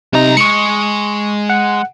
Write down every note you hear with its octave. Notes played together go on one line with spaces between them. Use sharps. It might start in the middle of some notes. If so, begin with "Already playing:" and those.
B1 C3 D#4 A#5
G#3 C#6 C#7
F#5